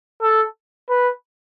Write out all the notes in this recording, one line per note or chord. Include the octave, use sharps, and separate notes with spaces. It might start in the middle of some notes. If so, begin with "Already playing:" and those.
A4
B4